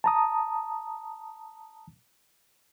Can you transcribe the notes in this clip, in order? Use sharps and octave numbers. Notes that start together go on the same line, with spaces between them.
A5 A#5 D#6